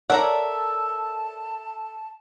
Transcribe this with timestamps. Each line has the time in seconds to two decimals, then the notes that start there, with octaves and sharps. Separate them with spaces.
0.10 A4 A#4 C#5 D5 E5 F#5 A5 A#5